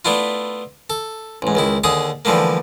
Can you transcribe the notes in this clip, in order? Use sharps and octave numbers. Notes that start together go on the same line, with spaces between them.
A3 B3 D4 E4 F4
A4
A1 G#2
C#2 D#3 E4
D#2 D3 G#4 A5 D#6
D3 E3 F3 G3 A3 A#3